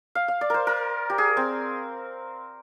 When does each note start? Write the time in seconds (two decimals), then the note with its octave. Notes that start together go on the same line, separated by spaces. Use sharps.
0.15 F5
0.28 F5
0.41 D5
0.50 A#4 C5
0.67 A#4
1.10 G4
1.18 G#4
1.37 C4